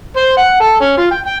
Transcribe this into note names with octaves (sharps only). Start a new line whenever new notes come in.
C5
F#5
A4
C#4
F4
G5
G5